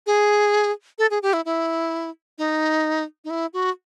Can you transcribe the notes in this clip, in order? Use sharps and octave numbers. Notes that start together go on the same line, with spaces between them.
G#4
A4
G#4
G4
E4
E4
D#4
D#4
E4
F#4